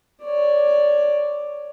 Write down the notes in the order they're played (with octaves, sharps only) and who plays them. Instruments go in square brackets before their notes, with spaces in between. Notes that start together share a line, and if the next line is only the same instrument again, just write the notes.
[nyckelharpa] C#5 D5